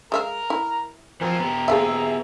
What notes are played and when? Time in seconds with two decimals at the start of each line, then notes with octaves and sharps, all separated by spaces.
0.12 G#3 A#4 E5 F5 A#5
0.50 E4
1.21 E3 F3 C4 A#4 G#5
1.40 B3 G4 A#5
1.68 F3 A#3 G#4 E5